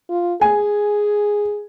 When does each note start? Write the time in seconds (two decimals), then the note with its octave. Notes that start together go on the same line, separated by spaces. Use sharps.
0.10 F4
0.41 G#4 G#5